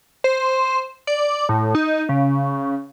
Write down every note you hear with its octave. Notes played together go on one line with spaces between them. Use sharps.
C5
D5
A2
D#4
C#3